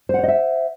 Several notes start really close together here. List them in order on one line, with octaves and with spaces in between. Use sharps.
C5 F#5 C#5 D#5 E5